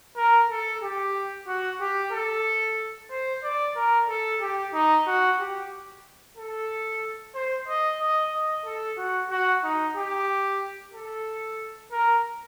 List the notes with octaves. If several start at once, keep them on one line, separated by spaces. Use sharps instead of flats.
A#4
A4
G4
F#4
G4
A4
C5
D5
A#4
A4
G4
D#4
F#4
G4
A4
C5
D#5
D#5
D#5
A4
F#4
F#4
D#4
G4
A4
A#4